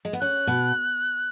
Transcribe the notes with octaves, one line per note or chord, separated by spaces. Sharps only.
G#3
B3
C#4 F#6
B2